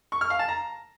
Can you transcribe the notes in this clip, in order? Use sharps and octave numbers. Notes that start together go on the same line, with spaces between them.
C#6
F6
F5
A5
A#5